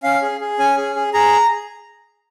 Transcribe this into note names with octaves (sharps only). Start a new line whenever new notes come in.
C#4 F5
G#4
G#4
C#4 G#5
G#4
G#4
G#4 A#5